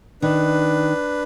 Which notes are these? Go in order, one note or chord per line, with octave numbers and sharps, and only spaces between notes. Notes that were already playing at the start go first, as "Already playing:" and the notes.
D#3 D4 B4